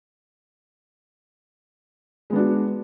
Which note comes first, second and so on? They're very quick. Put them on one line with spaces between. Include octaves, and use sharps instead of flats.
G#3 B3 D4 F#4